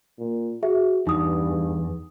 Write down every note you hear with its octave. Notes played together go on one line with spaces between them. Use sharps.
A#2
F#4 G#4 E5
E2 G2 D#4 D#6